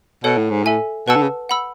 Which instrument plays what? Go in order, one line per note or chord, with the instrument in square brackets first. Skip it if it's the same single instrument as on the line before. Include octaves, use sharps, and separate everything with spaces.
[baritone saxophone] B2 [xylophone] A4 C#5 F#5
[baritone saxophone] A2
G#2
[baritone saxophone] A2 [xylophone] A4 E5 G#5
[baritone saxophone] B2 [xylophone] B4 F#5 A5 E6
[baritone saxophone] D3
C#3
[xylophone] F#5 B5 E6